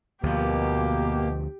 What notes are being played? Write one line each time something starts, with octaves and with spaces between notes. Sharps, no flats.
D2 B2 F3 A#3 G4